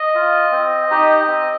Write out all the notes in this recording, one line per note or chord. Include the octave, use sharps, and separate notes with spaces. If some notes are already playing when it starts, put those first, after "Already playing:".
Already playing: D#5
F4
C4
D#4 G4
C4